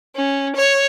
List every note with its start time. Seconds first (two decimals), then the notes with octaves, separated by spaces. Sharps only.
0.16 C#4
0.56 C#5